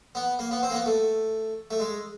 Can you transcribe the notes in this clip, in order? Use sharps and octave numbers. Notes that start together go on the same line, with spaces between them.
B3
A#3
B3
C4
A#3
B3
A3
A3
G#3